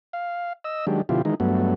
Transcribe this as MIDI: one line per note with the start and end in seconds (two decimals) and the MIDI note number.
0.13 0.53 77
0.64 0.85 75
0.64 0.85 88
0.87 1.02 51
0.87 1.02 54
0.87 1.02 56
0.87 1.02 62
0.87 1.02 67
1.09 1.22 47
1.09 1.22 50
1.09 1.22 53
1.09 1.22 64
1.09 1.22 65
1.09 1.22 67
1.25 1.35 51
1.25 1.35 52
1.25 1.35 56
1.25 1.35 63
1.40 1.74 43
1.40 1.74 54
1.40 1.74 57
1.40 1.74 59